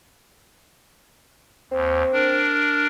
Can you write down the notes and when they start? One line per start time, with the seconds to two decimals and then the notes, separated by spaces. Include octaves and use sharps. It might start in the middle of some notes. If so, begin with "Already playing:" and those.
1.71 D#2 C4
2.12 D4 A#4